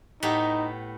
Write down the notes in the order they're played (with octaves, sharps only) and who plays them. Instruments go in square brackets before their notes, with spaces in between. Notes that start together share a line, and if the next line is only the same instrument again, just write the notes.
[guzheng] A2 B3 G4 [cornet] D#4